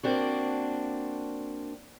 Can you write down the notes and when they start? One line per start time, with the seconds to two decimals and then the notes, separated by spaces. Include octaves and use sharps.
0.03 A#3 C4 D4 F#4